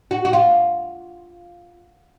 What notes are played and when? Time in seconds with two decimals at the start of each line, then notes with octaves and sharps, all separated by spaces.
0.11 F#4
0.25 F#4
0.33 F4